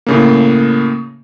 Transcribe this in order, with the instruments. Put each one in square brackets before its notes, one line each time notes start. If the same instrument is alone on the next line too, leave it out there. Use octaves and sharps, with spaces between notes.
[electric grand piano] A2 C#3 A#3